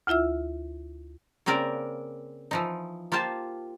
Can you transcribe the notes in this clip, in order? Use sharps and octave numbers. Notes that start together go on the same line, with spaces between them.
D2 E4 F4 E5 E6
C#3 A#3 C4 A#4 D5
E3 F3 D#4
A#3 F4 G4 C5 A5